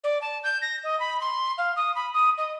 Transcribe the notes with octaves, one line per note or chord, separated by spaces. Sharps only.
D5
A5
G6
A#6
D#5
B5
C6
F5
D#6
B5
D#6
D#5